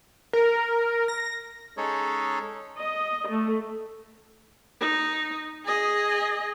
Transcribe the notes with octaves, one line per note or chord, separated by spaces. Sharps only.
A#4
A#6
G#3 C#4 D#4 G#4 A4 C#5
D#5
A3
D#4
G#4 D#5